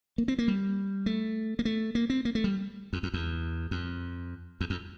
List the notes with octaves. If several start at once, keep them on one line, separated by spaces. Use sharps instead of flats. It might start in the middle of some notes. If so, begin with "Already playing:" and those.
A#3
C4
A#3
G3
A3
A#3
A3
A#3
C4
A#3
A3
G3
F2
F2
E2
F2
E2
F2